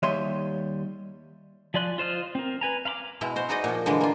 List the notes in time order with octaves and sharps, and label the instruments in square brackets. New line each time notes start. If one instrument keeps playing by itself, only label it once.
[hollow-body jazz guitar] D#2 G3 C#5 D#5 E5 C6
[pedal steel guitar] F3 G#4 D5 C6 F#6
F4 C5 D#5 F6
C4 A#4
B4 G#5 A#5
F5 A#5 B5 D6
[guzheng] B2 G#3 E4
F#4 C5
D#4 F#4 G#4 D5 D#5
A#2 F3
D3 E3 G#3
A#3 F4